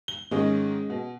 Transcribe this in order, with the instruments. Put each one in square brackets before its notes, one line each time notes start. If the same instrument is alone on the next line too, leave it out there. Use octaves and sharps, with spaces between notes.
[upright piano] G7
[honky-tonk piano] G#2 D#3 [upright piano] G#3 C#4 D#5
[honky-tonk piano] B2